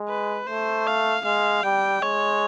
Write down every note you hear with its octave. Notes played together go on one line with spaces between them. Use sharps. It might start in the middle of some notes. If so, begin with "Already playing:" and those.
Already playing: G#3
B4
A3 C5
F5
G#3 F5
G3 G5
G#3 C#5